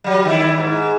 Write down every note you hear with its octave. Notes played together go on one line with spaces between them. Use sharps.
F#3 G3
D#3 E4
G#2